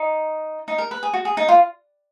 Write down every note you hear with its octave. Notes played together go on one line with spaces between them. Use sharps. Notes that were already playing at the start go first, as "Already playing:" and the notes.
Already playing: D#4
D#4
A#4
B4
G#4
F#4
G#4
D#4
F4